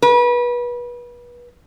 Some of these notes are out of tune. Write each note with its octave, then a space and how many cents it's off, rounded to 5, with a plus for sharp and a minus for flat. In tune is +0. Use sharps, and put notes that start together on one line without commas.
B4 -30